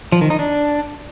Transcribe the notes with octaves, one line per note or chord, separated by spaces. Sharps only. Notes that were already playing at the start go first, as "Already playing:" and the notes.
F3
D#3
D#4
D4